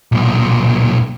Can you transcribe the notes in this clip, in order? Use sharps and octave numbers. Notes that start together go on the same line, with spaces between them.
B1 A#2